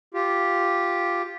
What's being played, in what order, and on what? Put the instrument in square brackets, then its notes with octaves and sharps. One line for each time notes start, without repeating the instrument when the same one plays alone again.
[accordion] F4 G4